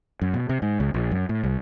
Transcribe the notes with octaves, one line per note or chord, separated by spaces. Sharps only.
F#2
B2
C3
G#2
C#2
A#1
F#2
A2
C2